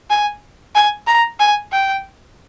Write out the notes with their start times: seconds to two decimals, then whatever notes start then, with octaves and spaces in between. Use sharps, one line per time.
0.10 G#5
0.75 G#5
1.07 A#5
1.40 G#5
1.72 G5